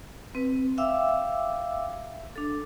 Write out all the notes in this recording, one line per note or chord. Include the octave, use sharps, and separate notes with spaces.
C4 B4
E5 F5 G5 D6 E6
D4 A4